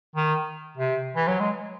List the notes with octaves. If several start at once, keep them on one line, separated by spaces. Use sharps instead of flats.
D#3
C3
E3
F#3
G#3